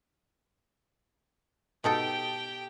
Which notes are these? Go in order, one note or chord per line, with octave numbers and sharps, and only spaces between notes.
B2 D#4 G4 A4 G5